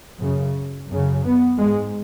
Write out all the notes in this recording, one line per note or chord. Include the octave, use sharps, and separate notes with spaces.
F#2 C#3
F#2 C#3
B3
G#2 G#3